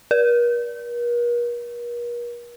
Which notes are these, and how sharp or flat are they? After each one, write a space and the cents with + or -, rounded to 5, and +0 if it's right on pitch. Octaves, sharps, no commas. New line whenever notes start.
A#4 +45